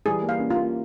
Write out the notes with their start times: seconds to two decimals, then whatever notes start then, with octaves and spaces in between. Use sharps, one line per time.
0.06 E3 G3 G#4
0.22 G3 A#3
0.29 F5
0.39 A#3 C#4
0.50 F4
0.56 A#3 C#4